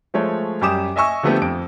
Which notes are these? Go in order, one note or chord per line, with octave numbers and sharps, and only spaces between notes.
F3 G#3 A3 C#5
F#2 G3 G4 D6 D#6 E7
D#5 E5 G#5 C#6 E6
D3 F3 A3 B3 C4 G4
F2 D7